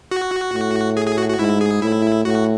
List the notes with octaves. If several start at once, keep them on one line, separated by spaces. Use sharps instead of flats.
F#4
A2
G#4
G#4
F#4
F#4
G#2 E4
G#4
A2 E4
A2 F#4